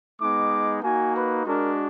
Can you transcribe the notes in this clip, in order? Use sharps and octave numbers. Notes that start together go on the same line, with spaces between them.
G#3 B3 D#4 D6
A#3 D#4 F#4 G#5
B4
G#3 D4 F#4 A#4